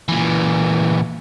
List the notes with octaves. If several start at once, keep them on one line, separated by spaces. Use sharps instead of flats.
A#2 E3